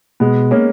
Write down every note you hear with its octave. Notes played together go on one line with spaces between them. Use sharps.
B2 G#3 B3
A#3 C#4